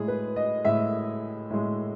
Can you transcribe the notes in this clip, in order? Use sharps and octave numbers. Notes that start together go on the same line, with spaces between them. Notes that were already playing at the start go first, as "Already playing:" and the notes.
Already playing: A2 G#3 G#4
B4
D#5
A2 G#3 E5
A2 G#3